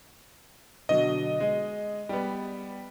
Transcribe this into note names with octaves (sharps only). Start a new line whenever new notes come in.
B2 D3 F#3 D#5
G#3
G3 B3